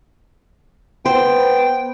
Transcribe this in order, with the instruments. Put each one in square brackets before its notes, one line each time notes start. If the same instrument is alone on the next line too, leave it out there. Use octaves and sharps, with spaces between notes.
[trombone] B3 [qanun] C5 [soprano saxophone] G5